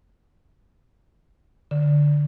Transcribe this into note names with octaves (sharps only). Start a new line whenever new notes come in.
D3